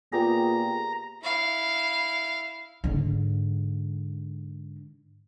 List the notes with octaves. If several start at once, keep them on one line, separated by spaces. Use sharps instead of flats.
A#2 B3 G4 G#4 A#5
E4 F5
G#2 D3